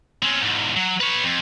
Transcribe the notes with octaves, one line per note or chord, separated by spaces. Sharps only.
C4 C#4
E2 G#2
F#3
B4 C#5
F2